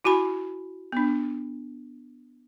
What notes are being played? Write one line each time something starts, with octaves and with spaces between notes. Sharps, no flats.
E4 F#4 G#5 B5
B3 D4